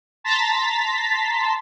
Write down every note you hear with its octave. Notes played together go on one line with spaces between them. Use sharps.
A5 A#5 C6 A6 B6